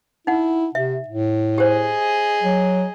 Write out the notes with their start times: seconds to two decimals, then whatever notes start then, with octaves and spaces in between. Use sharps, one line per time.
0.27 D#4 E4 F#5
0.75 C3 E5
1.08 A2
1.58 G4 G#4 C5 D#5
2.43 F#3